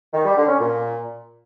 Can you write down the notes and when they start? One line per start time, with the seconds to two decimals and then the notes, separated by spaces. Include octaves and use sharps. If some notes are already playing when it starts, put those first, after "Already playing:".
0.13 D#3
0.25 G3
0.36 D3
0.48 C#4
0.59 A#2